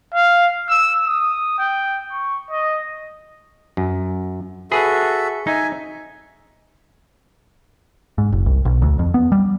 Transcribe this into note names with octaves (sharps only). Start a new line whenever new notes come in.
F5
E6
D#6
G5
C#6
D#5
F#2
F#4 G#4 A4 B4 E5
D#4 E5 G#5
G#2
F#1
C2
B1
D2
F2
B3
G3